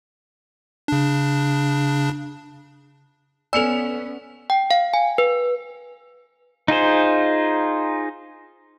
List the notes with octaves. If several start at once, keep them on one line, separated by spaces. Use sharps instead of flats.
C#3 D4
B3 C#4 A4 D5 G#5 E6 C#7 F7
G5
F5
G#5
B4
D#4 F4 G#4 C5